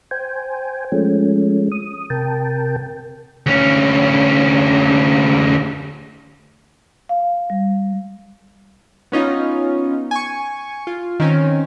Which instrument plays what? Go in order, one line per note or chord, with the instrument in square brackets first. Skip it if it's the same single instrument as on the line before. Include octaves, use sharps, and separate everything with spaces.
[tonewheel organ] C5 G5 G#5
F3 G#3 A3 C#4
D#6
C3 A#4 G5 A5
[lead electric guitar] D2 C#4
[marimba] F5
G3
[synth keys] B3 C#4 D#4 F4
G#5 C#6
F4
D#3 C4 C#4